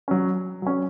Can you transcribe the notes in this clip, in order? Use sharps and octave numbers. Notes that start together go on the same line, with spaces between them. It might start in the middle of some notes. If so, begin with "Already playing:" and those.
F#3 C#4
F#3 C#4